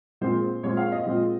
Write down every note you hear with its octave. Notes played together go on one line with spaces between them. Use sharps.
A#2 G#3 C4 F4 C5
A#2 G#3 C4 F4 C#5
F5
D#5
A#2 G#3 C4 F4